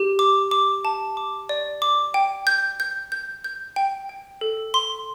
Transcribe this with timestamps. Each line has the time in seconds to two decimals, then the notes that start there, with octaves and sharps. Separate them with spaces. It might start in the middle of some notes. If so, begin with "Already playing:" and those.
Already playing: G4
0.19 D6
0.51 D6
0.85 A5
1.17 D6
1.49 D5
1.82 D6
2.14 G5
2.47 G6
2.80 G6
3.12 G6
3.44 G6
3.76 G5
4.09 G5
4.41 A4
4.74 C6